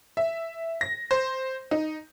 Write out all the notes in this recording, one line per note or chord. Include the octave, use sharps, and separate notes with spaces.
E5
A#6
C5
D#4